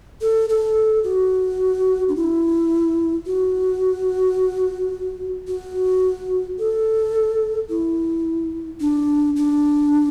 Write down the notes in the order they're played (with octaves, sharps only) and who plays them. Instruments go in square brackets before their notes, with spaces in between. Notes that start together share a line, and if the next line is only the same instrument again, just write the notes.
[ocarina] A4
A4
F#4
D4
E4
F#4
F#4
A4
E4
D4
D4